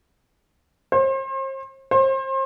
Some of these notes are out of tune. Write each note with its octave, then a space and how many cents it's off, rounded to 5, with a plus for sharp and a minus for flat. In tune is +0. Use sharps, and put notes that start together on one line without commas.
C5 +40
C5 +35